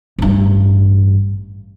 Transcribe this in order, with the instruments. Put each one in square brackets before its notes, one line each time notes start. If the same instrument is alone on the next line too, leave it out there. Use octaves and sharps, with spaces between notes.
[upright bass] A1 G2